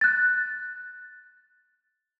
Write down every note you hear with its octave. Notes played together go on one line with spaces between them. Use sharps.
F#6 A6